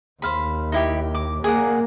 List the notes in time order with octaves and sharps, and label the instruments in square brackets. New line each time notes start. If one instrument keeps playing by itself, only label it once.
[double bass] D#2 [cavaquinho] C5 F5 B5
[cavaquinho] D#4 E4 G4
D6
[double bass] A#3 [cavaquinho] G#4 D5 F#5